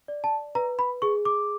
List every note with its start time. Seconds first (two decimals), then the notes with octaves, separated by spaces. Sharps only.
0.08 D5
0.24 A5
0.55 B4 A#5
0.79 B5
1.02 G#4 C#6
1.25 D6